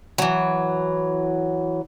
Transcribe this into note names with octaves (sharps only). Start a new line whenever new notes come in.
E3 F#3